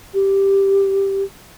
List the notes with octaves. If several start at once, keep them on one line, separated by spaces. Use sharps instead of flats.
G4